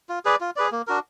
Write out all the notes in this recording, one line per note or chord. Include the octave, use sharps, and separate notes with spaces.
F4
G#4 B4 D5
F4
G#4 B4 D5
A#3
D4 F#4 A#4